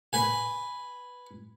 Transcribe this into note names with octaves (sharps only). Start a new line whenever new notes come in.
B4 G#5